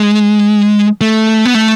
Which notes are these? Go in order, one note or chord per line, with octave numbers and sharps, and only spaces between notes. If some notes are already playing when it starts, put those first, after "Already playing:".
Already playing: G#3
A3
B3
A3